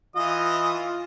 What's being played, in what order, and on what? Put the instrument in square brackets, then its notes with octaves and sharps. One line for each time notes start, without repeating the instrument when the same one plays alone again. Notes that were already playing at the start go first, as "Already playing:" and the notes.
[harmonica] E3 D#5 D#6 [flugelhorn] F4